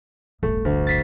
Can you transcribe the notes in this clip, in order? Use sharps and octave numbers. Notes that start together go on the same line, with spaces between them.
D1 G1 A3
D2
A6 B6 C7